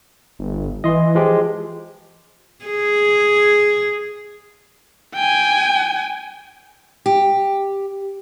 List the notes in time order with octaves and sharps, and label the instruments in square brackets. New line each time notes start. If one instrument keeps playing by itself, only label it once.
[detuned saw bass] G1
[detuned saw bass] E3 [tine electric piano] D#5 C6
[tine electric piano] F3 G#3 G4
[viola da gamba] G#4
[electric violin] G5 G#5
[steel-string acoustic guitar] G4